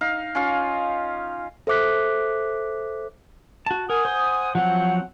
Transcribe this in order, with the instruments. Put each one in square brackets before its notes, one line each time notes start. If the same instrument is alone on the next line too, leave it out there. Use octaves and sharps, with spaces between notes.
[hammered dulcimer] D#4 F5
C#4 F4 F5
[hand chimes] A4 C5 E5 D6 F#6 B6
[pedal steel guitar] F#4 A5
[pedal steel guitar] A#4 [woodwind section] F#5 G#5 D#6
[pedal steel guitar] C5 C6
[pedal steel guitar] F3 F#3 C4 [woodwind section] F#5